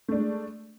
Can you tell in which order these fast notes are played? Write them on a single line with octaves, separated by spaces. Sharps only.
A3 D4 G#3